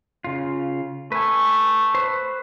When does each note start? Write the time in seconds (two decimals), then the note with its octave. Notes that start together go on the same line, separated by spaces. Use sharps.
0.24 C#3 F4
1.12 A3 B4 G#5
1.95 B4 C5